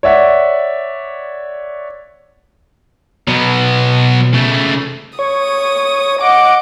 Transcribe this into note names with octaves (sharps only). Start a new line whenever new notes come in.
C#5 D5 E5 F#5
B2 F#3 B3
C#3 A3
C#5 D#6
D#5 F#5 D6